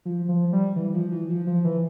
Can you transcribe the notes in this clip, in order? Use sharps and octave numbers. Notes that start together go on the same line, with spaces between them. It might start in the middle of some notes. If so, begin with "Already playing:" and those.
F3
F3
G3
E3
F3
E3
F3
F3
E3